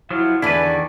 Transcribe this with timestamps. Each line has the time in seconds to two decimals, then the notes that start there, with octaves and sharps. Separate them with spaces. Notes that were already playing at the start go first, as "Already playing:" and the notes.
0.10 F3 F#3 E4 F5
0.42 E2 D3 E4 B4 D5 G#5
0.65 D#3